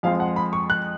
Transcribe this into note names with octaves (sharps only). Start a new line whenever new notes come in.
F2 F3 G#3 F5
F#5
B5
C#6
F#6